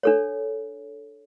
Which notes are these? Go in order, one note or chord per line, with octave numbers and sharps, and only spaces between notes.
D4 A4 C#5